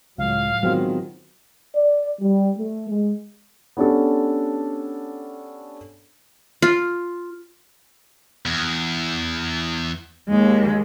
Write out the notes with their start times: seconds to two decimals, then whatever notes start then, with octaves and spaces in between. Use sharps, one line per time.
0.18 C#2 A2 F#3 F5
0.63 D#3 F#3 G#3 B3 C4 F4
1.75 D5
2.20 G3
2.57 A3
2.88 G#3
3.77 B3 C#4 D4 G4 A4
6.62 F4
8.46 E2
10.29 D#2 G#3